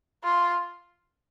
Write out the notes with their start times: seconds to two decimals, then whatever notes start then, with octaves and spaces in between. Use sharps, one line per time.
0.24 F4